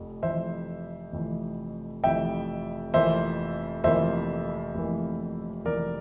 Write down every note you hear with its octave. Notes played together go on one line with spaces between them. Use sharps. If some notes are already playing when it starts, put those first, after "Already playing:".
Already playing: F1 F2
F1 F2 E3 C5 E5
F1 F2 E3
F1 F2 E3 E5 G5
F1 F2 E3 A#3 C5 E5
F1 F2 E3 A#3 C5 E5
F1 F2 E3 A#3
F1 F2 E3 A#3 A#4 D5